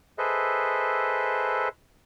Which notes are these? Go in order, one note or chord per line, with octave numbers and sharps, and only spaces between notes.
G#4 A4 B4 C5 D#5 E5